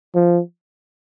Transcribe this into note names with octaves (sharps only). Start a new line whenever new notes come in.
F3